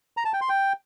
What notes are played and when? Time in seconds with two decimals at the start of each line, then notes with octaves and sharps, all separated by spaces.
0.17 A#5
0.25 A5
0.33 G5
0.41 C6
0.49 G5